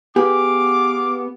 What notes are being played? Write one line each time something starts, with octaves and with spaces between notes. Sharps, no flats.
B3 G4 G#4 F5 D6